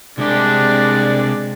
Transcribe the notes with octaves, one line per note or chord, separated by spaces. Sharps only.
C2 G#3 D4 G4 D5